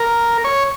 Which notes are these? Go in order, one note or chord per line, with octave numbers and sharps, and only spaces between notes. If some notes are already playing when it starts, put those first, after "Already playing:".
Already playing: A#4
C#5